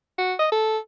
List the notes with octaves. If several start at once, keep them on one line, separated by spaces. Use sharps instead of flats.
F#4
D#5
A4